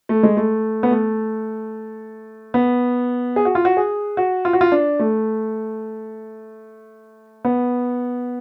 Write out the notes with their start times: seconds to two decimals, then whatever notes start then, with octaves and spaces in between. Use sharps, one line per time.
0.09 A3
0.23 G#3
0.37 A3
0.83 B3
0.91 A3
2.54 B3
3.36 G#4
3.45 F#4
3.55 F4
3.65 F#4
3.77 G#4
4.17 F#4
4.45 F4
4.53 F#4
4.61 F4
4.72 D4
4.99 A3
7.45 B3